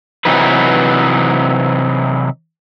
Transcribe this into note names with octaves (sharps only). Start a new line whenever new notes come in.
C3 E3 F#3 D#4 B4